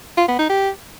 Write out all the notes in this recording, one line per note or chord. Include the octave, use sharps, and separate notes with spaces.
F4
B3
D#4
G4